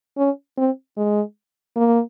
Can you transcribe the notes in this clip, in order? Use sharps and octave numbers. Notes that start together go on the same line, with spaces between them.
C#4
C4
G#3
A#3